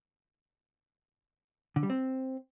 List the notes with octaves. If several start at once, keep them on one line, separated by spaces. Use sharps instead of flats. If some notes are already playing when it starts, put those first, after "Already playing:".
D3
G3
C4